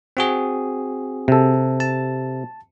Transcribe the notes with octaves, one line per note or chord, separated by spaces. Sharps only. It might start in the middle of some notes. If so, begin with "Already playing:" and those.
C4 F#4 G#4
C3 A4
A5